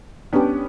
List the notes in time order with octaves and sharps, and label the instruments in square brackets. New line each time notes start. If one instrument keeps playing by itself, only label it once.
[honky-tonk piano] B3 C#4 [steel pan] D4 G4